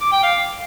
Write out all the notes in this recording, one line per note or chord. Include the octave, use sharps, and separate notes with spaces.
D6
G5
F5